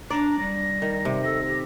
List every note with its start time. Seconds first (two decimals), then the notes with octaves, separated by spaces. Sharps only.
0.10 D4 D5 A#5
0.39 G3 A#6
0.82 D#3
1.05 C3
1.23 A4 A#6
1.46 G4